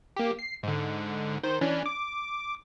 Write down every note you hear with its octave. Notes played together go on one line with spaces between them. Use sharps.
A#3 G4
C7
G#2 D3
D#3 C5
E3 C#4 D4
D6